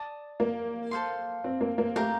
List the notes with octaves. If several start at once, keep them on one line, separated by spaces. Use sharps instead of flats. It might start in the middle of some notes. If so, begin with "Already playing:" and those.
Already playing: D5 A5 D#6
A#3
A4 C5 F5 C6
C4
A#3
A#3
A3 G4 A#4 F5 A#5